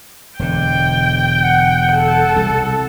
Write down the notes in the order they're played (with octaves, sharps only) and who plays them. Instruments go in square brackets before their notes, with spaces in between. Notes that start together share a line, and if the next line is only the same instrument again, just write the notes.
[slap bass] E1 D3 [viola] G5
[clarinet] F#5
[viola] A4
[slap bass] C2